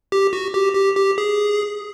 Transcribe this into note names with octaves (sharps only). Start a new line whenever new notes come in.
G4
F#4
G4
G4
G4
G#4